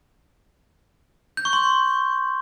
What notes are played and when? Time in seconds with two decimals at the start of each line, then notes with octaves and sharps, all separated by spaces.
1.37 G6
1.45 C#6
1.53 C6